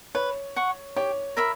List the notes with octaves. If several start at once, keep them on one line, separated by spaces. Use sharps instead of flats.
B4 C#5
F#5 C#6
G4 C#5
A#4 E5 B5